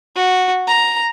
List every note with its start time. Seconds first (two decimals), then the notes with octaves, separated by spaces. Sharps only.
0.16 F#4
0.68 A#5